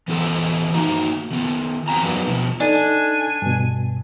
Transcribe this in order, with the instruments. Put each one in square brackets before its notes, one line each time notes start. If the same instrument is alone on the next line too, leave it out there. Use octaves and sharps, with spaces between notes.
[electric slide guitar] E3 B3 F4 A4
A#3 D#4 F#4 A#5
D#3 B3
E2 C4 G#5 A#5
F#3 A#3 B3 D4
B2 F3
[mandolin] D4 [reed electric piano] D#4 A4 [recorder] G#5
[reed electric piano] G2 B2